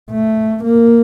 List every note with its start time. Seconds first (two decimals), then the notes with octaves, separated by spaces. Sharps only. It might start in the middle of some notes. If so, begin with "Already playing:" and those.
0.11 A3
0.64 A#3